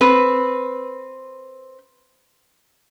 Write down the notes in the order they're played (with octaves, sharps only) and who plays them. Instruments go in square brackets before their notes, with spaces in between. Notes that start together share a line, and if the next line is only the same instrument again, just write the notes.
[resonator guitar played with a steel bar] C4 B4